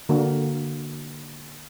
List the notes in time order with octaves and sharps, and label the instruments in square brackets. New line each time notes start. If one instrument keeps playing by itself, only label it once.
[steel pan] D3 A#3 F#4